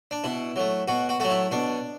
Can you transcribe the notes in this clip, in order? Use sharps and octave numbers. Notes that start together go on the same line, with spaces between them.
D4
B2 E4
F#3 A3
B2 F#4
F#4
F#3 A3 F#4
E4
B2 D4